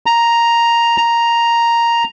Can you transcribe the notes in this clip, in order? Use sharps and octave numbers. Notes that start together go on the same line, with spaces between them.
A#5
A#5